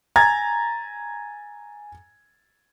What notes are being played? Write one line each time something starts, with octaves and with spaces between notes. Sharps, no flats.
G#5 A#5 G#6 A6